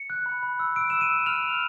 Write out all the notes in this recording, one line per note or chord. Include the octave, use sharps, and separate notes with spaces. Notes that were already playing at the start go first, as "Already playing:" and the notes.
Already playing: C#7
F#6
B5
B5
E6
E6 D7
E6 E7
D#7
E6
F6 F7
F6